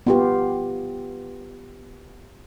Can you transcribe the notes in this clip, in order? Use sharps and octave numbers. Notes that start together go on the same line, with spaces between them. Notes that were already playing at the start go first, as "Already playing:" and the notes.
B3 F4 G4